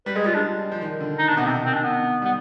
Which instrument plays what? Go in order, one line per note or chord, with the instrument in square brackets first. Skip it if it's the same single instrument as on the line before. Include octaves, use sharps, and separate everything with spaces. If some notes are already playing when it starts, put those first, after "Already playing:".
[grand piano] G3 [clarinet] B4
[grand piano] G#3 [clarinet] G#4
[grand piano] G3 [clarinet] F4
[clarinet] D4
[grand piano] F3
D#3
D3
[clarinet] D#4
D4
[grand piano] B2
[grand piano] C3 [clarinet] B3
[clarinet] C4
[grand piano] D#3
[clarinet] C4
D4
B3
[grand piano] G3 [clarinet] B3